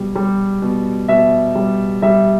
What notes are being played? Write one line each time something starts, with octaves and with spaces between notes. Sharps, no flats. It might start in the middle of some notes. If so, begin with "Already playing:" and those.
Already playing: B2 G3
G3
B2
B2 E5
G3
G3 E5